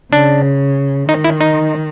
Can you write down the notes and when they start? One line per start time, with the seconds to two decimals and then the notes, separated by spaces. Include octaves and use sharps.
0.13 C#3 D4
1.09 D#3 D#4
1.24 E4
1.41 D#4